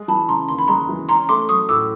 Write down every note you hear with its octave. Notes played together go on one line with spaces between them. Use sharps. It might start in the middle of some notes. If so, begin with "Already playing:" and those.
Already playing: G#3
E3 A5 B5
C#3 A#5 C6
D#2 C6
B5
G#3 A#5 C6
E3
C#4 A#5 C6
A3 C6 D6
F#3 C#6 D#6
A2 D6 E6